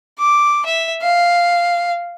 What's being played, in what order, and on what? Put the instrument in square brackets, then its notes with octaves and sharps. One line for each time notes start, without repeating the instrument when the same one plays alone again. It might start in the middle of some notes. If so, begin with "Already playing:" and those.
[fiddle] D6
E5
F5